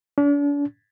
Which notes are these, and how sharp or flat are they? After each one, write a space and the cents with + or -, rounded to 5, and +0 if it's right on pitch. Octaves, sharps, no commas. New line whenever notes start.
D4 -40